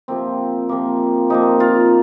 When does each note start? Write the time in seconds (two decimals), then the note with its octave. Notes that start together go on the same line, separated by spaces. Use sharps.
0.08 C3 F3 A#3 C4
0.69 C3 F3 A#3
1.30 C3 F3 A#3 D#4
1.60 F4